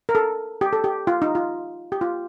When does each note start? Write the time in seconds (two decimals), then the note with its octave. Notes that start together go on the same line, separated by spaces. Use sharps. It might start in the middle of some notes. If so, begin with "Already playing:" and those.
0.09 A#4
0.15 A4
0.61 G4
0.73 A4
0.84 G4
1.07 F4
1.22 D#4
1.35 F4
1.92 G4
2.01 F4